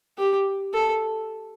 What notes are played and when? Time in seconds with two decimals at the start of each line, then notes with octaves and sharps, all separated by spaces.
0.18 G4
0.74 A4